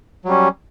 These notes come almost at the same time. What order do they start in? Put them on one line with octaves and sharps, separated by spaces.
F#3 G3 C#4